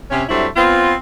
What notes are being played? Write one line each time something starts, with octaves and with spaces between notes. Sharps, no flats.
C3 C#4
F#3 G3 A3 C4 D4 E4
B3 C4 F4